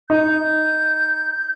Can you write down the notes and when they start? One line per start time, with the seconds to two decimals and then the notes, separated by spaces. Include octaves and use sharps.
0.10 D#4 G6